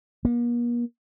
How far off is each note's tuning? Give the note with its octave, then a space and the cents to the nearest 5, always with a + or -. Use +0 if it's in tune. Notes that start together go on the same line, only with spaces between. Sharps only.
A#3 +45